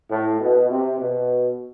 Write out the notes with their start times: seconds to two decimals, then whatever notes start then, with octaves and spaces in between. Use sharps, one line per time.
0.11 A2
0.41 B2
0.70 C3
0.98 B2